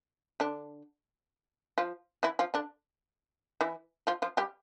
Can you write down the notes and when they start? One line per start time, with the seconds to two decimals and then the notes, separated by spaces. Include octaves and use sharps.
0.40 D3 D4
1.78 F3 F4
2.23 E3 E4
2.39 F3 F4
2.54 D3 D4
3.61 E3 E4
4.07 F3 F4
4.22 F3 F4
4.37 G3 G4